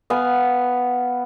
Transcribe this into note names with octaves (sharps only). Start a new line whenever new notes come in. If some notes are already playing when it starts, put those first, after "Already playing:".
B3 F5 G#5